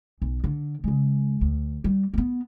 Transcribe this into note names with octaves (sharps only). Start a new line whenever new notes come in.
B1
D3
C#3 G#3
D2
G3
A#3 B3